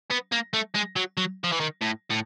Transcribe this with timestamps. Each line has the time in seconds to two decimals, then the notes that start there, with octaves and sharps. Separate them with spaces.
0.10 B3
0.32 A#3
0.54 A3
0.75 G#3
0.96 F#3
1.17 F#3
1.44 F3
1.52 E3
1.60 D#3
1.81 A2
2.10 A2